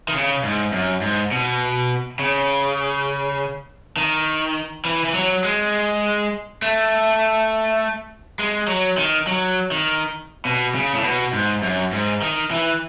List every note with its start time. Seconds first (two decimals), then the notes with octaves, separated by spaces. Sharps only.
0.08 D#3
0.14 C#3
0.43 G#2
0.72 F#2
1.01 G#2
1.32 B2
2.19 C#3
3.97 D#3
4.85 E3
5.05 E3
5.14 F#3
5.44 G#3
6.62 A3
8.39 G#3
8.68 F#3
8.97 D#3
9.27 F#3
9.71 D#3
10.45 B2
10.75 C#3
10.94 A2
11.04 B2
11.33 G#2
11.62 F#2
11.92 G#2
12.22 D#3
12.51 E3